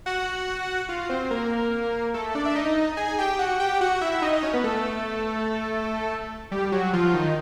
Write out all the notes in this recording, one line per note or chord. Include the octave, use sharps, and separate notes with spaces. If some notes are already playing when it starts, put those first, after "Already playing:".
F#4 F#5
F4 F5
C4 C5
A#3 A#4
A3 A4
D4 D5
E5
D#4 D#5
G#4 G#5
G4 G5
F#4 F#5
G4 G5
F#4 F#5
E4 E5
E5
D#4 D#5
D#4 D#5
C#4 C#5
B3 B4
A3 A4
G3 G4
F#3 F#4
F3 F4
D#3 D#4